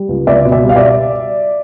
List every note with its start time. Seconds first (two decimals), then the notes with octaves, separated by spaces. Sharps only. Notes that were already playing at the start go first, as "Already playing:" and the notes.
Already playing: G3
0.09 C#2
0.27 C#2 D5 E5
0.45 B2
0.52 D5 E5
0.64 G3 F5
0.76 D5 E5